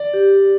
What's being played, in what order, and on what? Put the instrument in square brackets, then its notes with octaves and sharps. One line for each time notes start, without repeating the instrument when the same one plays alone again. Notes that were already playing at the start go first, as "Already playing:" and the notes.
Already playing: [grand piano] D5
[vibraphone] G4
G4